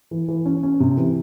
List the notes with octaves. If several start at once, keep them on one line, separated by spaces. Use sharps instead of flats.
E3
E3
C#4
C#4
C3
E3